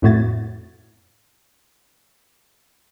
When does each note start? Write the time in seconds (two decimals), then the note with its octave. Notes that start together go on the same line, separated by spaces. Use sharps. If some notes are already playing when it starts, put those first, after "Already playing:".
0.02 F2 A2 A3 F#4 G#6 A6